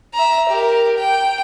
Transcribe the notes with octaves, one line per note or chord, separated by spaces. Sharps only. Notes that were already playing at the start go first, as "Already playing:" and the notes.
E5 A#5
G4 A#4
G5